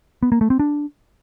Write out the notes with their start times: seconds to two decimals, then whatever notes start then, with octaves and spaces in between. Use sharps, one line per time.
0.23 B3
0.32 A#3
0.41 A3
0.50 C4
0.60 D4